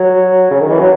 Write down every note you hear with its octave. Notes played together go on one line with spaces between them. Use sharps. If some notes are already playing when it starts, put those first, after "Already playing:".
Already playing: F#3
C#3
D#3
E3
F#3